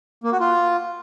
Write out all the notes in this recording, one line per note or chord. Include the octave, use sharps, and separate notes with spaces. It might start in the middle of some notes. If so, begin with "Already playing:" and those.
A#3
F#4
F4